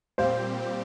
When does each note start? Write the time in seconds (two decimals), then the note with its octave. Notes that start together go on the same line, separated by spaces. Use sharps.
0.18 A#2 G3 C4 G4 C5 F5